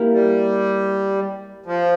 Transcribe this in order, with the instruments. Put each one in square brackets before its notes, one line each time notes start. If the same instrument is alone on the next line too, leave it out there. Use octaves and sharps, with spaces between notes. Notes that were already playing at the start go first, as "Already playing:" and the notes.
Already playing: [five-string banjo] A#3 E4 G4 A#4
[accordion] G3
F3